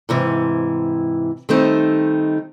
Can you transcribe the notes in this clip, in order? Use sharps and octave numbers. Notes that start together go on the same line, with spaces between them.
G#2 C3 E3
D#3 G3 A3 C4 D#4